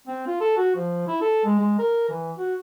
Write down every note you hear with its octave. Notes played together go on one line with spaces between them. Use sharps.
C4
F4
A4
F#4
F3
E4
A4
G#3
G#3
A#4
E3
F#4